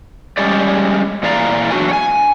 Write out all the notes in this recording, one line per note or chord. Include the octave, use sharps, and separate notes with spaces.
G3 G#3 C#4 G4 G#4 D5
A#2 E3 G#4 D5 F5 A#5
E2 F#3 D4 F#4 A#4 G#5
C#5 G#5